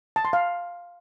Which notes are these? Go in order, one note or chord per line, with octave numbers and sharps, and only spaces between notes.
A5
C6
F5